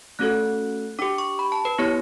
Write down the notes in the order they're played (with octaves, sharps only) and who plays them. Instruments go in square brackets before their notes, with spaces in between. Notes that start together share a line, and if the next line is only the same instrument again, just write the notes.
[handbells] A3 C#4 F#4 A4 F#6
D4 G4 D6
C#6
B5
A5
B4
B3 E4 G4 C#5